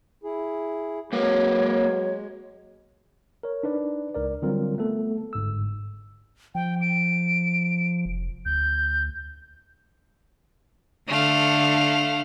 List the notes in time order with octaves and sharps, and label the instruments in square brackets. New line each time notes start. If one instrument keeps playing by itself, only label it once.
[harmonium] E4 G#4
[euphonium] F#3 [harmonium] G#3 [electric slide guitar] A#3 A#4 B4 [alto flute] C#5
[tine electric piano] A#4 C#5
D4 D#4 B4 D5
C#2 A#4 D5
D3 F#3 G3 C4 F4 A#4
A3 B3 A4
G1 G#2 E6
[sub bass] F3 [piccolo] G5
[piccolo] D7
[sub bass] F1
[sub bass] D2 [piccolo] G6
[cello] D3 [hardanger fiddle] A3 F5